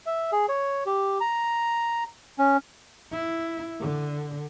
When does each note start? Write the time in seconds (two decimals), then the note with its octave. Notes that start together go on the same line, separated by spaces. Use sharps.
0.06 E5
0.32 G#4
0.49 C#5
0.86 G4
1.20 A#5
2.38 C#4
3.12 E4
3.80 D3